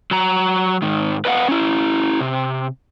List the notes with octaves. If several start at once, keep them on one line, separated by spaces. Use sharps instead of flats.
F#3 A#5
G#2 D#3
B4 D#5 F5 F#5
C#4 E4
C3